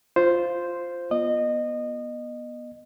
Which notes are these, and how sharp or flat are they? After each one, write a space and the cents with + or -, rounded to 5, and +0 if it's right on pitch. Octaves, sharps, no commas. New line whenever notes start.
F4 +0 C5 +0
B3 -25 D#5 -25